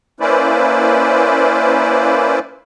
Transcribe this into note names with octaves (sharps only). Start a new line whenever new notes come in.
A#3 C#4 E4 B4 C5 D5